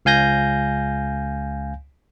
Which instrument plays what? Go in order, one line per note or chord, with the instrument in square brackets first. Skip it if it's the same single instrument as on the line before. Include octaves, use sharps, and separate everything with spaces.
[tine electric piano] C#2 F5 G#5 G6 A#6